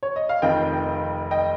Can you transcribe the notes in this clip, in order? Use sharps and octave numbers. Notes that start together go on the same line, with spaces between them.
C#5
D#5
F5
F1 F2 D#3 D#5 G5
D#5 G5